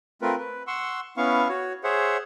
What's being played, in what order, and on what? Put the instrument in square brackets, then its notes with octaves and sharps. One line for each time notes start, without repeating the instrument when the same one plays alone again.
[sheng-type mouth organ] A3 C4 F4 A#4 B4
B4
F#5 C6 C#6 E6
B3 C#4 E4 F5 C#6
F#4 C#5
G#4 C5 C#5 E5 F#5